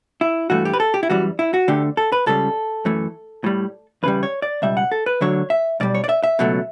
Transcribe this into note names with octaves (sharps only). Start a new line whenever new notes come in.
E4
G2 E3 A3 F#4
G4
B4
A4
G4
E4
F#2 E3 G3 F#4
E4
F#4
D2 D3 A3 G4
A4
B4
C#2 C#3 G3 A4
F#2 E3 A3
A2 G3
E2 C#3 G3 B4
C#5
D5
C#2 B2 G3 E5
F#5
A4
B4
D2 D3 F#3 C#5
E5
B1 B2 G3 D5
C#5
D5
E5
E5
C#2 B2 F#3 A3